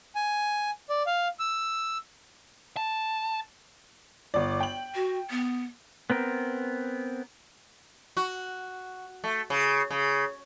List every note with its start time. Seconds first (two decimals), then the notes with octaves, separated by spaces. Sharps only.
0.15 G#5
0.90 D5
1.07 F5
1.39 E6
2.77 A5
4.34 G1 D5
4.60 G5 F#7
4.95 F#4
5.30 B3
6.10 B3 C4 A#4
8.17 F#4
9.24 A3
9.50 C#3
9.91 C#3